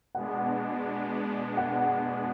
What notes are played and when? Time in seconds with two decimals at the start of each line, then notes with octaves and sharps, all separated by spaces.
0.15 B2 G#3 B3 D4 F#5
1.57 F#5